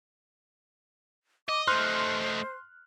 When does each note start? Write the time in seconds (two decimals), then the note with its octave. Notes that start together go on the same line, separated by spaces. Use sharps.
1.48 D#5 D6
1.67 A3 D#4 C5 C6 F6 F#6